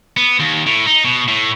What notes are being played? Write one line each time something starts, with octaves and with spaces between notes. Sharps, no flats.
B3
D#2
A2
D#4
B2
A2